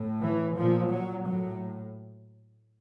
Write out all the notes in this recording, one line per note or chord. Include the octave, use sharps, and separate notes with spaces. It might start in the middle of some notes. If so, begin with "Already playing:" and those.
Already playing: A2
E3
A#2 F3
F#3
A2 F#3